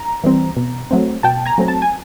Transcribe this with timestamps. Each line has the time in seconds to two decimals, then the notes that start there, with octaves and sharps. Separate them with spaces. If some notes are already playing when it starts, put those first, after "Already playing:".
Already playing: A#5
0.24 E3 G3 C4
0.56 B2
0.91 F#3 A3 C4
1.23 B2 G5 A5
1.46 G#5 A#5
1.58 F#3 A3 C4
1.68 A5
1.82 G#5